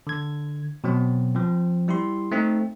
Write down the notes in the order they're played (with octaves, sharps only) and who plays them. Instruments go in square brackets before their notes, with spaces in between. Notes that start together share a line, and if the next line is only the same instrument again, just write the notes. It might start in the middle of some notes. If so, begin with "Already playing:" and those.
[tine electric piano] D3 G#6
B2 F#3 C4
F3 C4
G3 E4 G4 C6
A3 C4 D#4